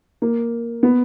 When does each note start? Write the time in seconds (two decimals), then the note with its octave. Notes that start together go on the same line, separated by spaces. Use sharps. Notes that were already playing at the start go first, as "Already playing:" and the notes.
0.22 A#3
0.83 B3